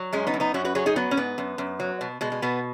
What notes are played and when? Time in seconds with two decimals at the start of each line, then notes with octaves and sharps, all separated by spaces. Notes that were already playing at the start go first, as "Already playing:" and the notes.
Already playing: F#3
0.13 F#2 G#3 C#4
0.27 B3 D#4
0.34 F#2
0.40 B3 D#4
0.54 F#2 C#4 F#4
0.65 F#4 B4
0.75 F#3 G#4 C#5
0.86 D#4 G#4
0.96 F#3 B3
1.11 C#4
1.17 G#2 B3
1.38 F#2
1.58 F#2
1.80 F#3
2.01 B2
2.21 B2 G#3
2.32 G#3
2.42 B2 B3